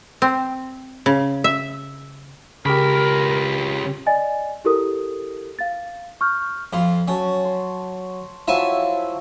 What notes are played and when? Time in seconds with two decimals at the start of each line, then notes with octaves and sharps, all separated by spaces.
0.22 C4
1.06 C#3
1.44 E5
2.66 C#2 C#3 G4 A#4 B5
4.06 D5 D#5 G#5 A6
4.65 E4 G4 A4 A#4 D#6
5.59 F5 A6
6.21 C#6 F6 G6
6.73 F2 F4 B5
7.08 F#3 C#4 A5
7.45 C6
8.48 F3 F#3 E4 E5 G#5 A5